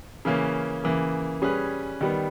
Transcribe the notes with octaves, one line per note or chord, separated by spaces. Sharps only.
C#3 E3 A#3 C#4
C#3 E3 A#3
G3 C#4 G#4 B4
D#3 G3 B3